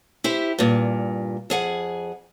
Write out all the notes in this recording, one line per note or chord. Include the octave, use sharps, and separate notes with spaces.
E4 G4 C5
G2 A#2
F2 G#4 F#5